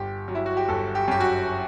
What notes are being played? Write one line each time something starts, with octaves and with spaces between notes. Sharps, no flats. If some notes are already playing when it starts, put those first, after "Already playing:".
Already playing: G1 G4
F#3
E4
F#4
G4
G1 A4
G4
F#2 G4
F#4